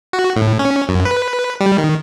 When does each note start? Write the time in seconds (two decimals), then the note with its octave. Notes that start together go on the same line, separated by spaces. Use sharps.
0.13 F#4
0.36 A2
0.59 C#4
0.89 F#2
1.05 B4
1.60 G3
1.78 D#3